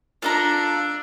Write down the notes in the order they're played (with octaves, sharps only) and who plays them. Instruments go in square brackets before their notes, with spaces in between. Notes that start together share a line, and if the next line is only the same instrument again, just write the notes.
[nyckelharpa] D4 [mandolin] F4 A4 A#5